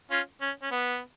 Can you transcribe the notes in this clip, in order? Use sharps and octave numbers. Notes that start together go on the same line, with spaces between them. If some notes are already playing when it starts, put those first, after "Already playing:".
C#4 F4
C#4
C#4
B3